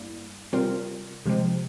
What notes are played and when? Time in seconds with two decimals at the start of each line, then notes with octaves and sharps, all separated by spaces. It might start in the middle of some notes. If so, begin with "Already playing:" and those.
Already playing: G2 G3 A#3 E4
0.53 C3 G3 C4 F4 A#4
1.26 C3 F3 G#3 C4